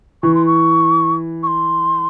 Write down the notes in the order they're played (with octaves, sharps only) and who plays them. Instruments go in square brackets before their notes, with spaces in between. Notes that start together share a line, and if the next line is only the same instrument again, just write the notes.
[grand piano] E3 [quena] C#6
[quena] C6
C#6
C#6
C6